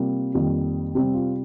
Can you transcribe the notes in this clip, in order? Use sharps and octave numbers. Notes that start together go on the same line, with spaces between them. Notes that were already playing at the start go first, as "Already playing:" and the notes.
Already playing: C3 G3 A#3 F4
F2 D#3 G3 A#3
C3 G3 C4 G4
F4